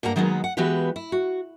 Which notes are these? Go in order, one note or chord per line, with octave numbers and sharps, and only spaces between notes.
G2 A#3 F#5 A#5
D#3 F#3 G#3 A#3 B3 D#4
F#5
E3 G#3 B3 F#4 G4 B4
E4
F#4